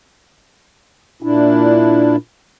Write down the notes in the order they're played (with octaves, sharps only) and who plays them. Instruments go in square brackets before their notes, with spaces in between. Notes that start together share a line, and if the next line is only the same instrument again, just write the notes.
[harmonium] A#2 D4 E4